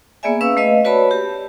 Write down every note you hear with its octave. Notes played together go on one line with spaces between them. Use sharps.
A#3 B3 G#4 D5 E5 G#5
C#4 B4 F5 E6
A3 B4 D#5 F5
F#4 B4 C#5 D5 A5 B5
G4